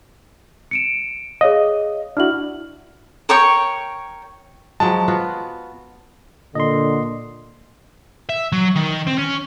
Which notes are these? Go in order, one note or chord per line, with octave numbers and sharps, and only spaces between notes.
C#7 D7 E7
G#4 C#5 D#5 F5
D4 E4 F#4 F6 F#7
A#4 C#5 G5 C#6
F3 F#3 G#3 A5
B3 F4 F#4
A#2 D3 D#5 C6
E5
F#3
D#3
C4
C#4